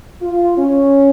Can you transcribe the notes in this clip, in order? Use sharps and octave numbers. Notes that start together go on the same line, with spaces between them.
F4
C#4